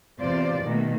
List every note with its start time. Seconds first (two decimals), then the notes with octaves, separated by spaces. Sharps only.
0.20 E2 C3 F4 C5 D5
0.64 B2 D#3 A3 A#3